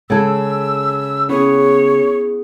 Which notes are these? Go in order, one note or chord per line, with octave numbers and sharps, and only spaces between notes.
C#3 G#3 A4 E6 G#6
B3 C#4 E4 G#4 C#5